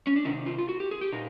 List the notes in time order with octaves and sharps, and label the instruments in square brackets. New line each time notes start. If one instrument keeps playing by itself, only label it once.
[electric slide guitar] C#4
D4
C3 D#3 D#4
F4
F4
F#4
G4
G#4
G4
A#2 D#4